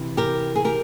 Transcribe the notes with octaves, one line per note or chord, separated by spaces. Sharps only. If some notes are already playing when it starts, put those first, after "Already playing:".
Already playing: C3 E3
G4 A#4
G#4
G4 A#4